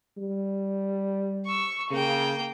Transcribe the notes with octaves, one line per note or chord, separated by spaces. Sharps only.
G3
C#6 E6
C#3 A#3 G5